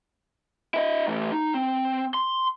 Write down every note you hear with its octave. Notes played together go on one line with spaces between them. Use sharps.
E4 D#5
E3 A3
D#4
C4
C6